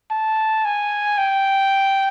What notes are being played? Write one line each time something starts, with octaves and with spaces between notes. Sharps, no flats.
A5
G#5
G5